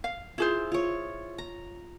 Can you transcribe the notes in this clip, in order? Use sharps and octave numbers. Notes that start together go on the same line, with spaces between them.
F5
E4 F4 G#4 C5
F4 C#5
A#5